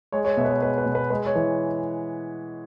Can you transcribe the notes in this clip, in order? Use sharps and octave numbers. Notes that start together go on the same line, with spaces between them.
G#3 C#5
C#5
B2 E5
B4
C#5
G#3 B4
B4
B2
B4
G#3 B4
C#5
E3